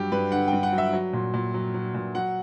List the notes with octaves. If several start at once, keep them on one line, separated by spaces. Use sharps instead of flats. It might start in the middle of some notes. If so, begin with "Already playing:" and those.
Already playing: G2 F#3 G4
G2 B4
D3 F#5
G2 G5
F#5
F#3
E5
F#3
A#2
A#2
F#3
F#3
A#2
F#3 F#5